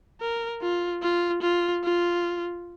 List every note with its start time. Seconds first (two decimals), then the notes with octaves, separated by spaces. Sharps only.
0.21 A#4
0.62 F4
1.03 F4
1.42 F4
1.84 F4